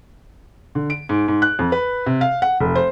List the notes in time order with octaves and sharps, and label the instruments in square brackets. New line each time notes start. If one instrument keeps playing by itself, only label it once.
[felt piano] D3
D7
G#2
G#2
F#6
F2
B4
C3
F5
F#5
F1
C5